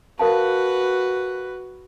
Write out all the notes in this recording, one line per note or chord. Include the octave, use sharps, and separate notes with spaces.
F#4 A#4 B4 F5 A5